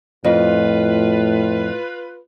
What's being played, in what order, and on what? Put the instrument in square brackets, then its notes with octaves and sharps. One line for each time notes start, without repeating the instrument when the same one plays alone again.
[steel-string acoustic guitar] F2 [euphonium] A2 [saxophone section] F4 B4